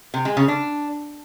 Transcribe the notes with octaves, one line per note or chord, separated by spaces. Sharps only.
C3
G#3
C#3
D4